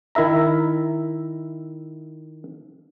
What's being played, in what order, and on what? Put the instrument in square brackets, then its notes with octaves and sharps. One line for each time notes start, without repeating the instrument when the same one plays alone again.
[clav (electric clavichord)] D#3 E4 A#4 E5 A#5